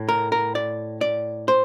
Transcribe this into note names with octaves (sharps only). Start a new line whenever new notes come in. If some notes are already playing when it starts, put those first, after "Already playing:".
Already playing: A2
A#4
A#4
D5
D5
C5